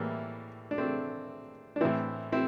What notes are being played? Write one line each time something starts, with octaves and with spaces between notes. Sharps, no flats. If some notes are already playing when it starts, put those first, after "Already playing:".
Already playing: A2 E3 G3 A#3
D4
A3 C4
D4
A2 E3 C4 E4
C4 E4